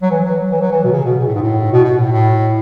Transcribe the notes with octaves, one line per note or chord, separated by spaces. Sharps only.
F#3
E3
F#3
E3
F#3
E3
B2
C#3
B2
B2
A2
G#2
A2
B2
B2
A2
A2